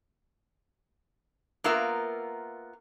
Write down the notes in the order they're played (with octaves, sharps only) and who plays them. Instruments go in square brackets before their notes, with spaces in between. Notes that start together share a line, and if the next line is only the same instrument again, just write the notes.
[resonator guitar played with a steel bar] A#3 B3 F4 A#4 E5